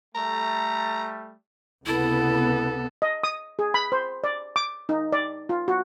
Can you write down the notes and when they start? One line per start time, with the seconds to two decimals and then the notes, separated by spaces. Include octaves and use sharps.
0.15 G3 A3 A#5
1.86 C#2 C3 B3 E4 A4
3.02 D#5
3.23 D#6
3.59 G#4
3.74 B5
3.92 C5
4.24 D5
4.56 D6
4.89 D#4
5.12 D5
5.49 F4
5.68 F#4